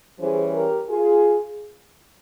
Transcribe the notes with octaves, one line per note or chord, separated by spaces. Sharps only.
E3 G3 C#4 G#4 C5
G4 A#4
F4 G#4